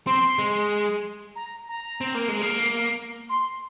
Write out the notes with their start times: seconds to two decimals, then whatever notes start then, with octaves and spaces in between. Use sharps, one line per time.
0.07 C4 C6
0.39 G#3
1.36 A#5
1.69 A#5
2.01 C4
2.15 A#3
2.28 G#3
2.41 A#3
3.29 C6